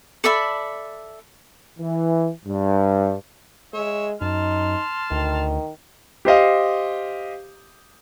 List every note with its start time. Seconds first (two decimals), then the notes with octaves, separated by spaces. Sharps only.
0.24 A4 D5 E5 B5
1.78 E3
2.46 G2
3.74 G#3 C#5 E5
4.21 F#2 D#4 A5 C6 F6
5.11 D2 D#3
6.25 G4 C5 D#5 F5